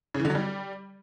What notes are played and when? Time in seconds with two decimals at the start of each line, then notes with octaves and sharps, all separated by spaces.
0.14 C#3
0.20 E3
0.25 D3
0.30 F#3
0.35 G3